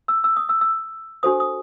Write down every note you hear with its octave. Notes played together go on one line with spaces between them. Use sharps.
E6
E6
D#6
E6
E6
D4 F#4 A4 C5 D#6
D#6